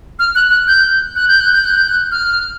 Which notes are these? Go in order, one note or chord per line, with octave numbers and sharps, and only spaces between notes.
F6
F#6
F#6
G6
F#6
G6
F#6
G6
F#6
G6
F#6
F6